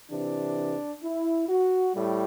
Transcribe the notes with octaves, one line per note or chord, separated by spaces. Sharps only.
C3 E3 D4
E4
F#4
A2 G3